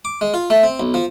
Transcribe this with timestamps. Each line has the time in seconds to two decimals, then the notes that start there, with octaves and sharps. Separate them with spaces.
0.05 D6
0.21 G#3
0.34 F4
0.50 A3
0.63 C4
0.80 B1
0.94 F3